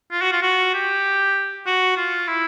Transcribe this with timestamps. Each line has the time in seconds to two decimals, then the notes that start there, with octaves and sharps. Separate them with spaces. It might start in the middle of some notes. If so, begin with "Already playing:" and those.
0.11 F4
0.22 F#4
0.32 F4
0.42 F#4
0.74 G4
1.66 F#4
1.97 F4
2.27 E4